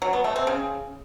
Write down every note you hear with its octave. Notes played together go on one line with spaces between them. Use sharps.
F#3
B3
A3
C4
C#3